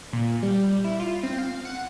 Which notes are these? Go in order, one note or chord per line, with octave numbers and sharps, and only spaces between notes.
A#2
G3
E4
F4
C4
F5
F#5